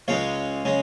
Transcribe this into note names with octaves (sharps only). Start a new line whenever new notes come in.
C#2 C#3 G#3 C#4 C#5 F5
C#3 G#3 C#4